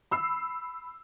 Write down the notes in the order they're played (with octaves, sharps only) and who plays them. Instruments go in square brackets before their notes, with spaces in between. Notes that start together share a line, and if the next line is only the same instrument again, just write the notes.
[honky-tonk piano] B5 E6 C7